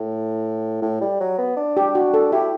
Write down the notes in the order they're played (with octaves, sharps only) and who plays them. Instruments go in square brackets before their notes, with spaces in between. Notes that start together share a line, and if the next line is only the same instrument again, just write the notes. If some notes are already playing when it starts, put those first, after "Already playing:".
Already playing: [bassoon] A2
A2
G3
F#3
B3
D4
[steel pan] G4
F#4
A4
[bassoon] E4 [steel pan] G4